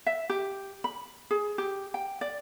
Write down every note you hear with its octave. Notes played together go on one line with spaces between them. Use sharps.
E5
G4
B5
G#4
G4
G5
D5